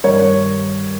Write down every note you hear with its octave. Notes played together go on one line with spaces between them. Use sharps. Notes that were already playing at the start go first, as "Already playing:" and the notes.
G2 D#3 A#4 C#5